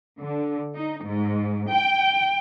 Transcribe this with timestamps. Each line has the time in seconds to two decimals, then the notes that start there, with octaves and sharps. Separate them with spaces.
0.19 D3
0.76 D#4
1.04 G#2
1.71 G5